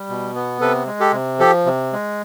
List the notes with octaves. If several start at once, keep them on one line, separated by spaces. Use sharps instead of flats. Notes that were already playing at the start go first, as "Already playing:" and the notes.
Already playing: G3
B2
B3
C3 A4 B4
G#3
G4 A4
C3
F3 G4 A4
C3
G#3